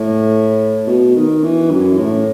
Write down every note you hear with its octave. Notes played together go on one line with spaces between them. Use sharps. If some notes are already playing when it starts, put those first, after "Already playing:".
Already playing: A2
B2
D#3
E3
F#2
A2